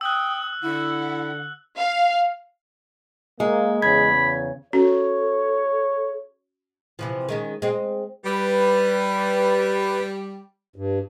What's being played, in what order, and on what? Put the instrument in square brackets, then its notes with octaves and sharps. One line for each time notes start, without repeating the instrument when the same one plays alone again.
[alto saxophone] G5 [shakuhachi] D#6 [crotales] E6 F#6
[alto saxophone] D3 [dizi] E4 [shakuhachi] F#5
[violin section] F5
[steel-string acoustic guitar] G#3 [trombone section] A#3
[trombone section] E2 C#3 [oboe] B5 [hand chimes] G#6
[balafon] C#4 [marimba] F#4 [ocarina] A4 [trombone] C#5
[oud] C3 E3 F3
D#3 G#3 C#4
G#3 C4
[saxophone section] G3 [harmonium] B4
[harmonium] G2